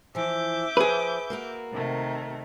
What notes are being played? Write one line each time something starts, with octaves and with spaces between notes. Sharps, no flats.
E3 F3 E5 D6 G6
F3 G#4 B4
A#3 F#4 A#4
C3 D#3 A3